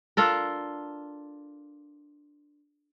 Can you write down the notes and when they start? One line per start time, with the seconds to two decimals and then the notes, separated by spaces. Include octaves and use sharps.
0.17 D4 F4 A4 A#4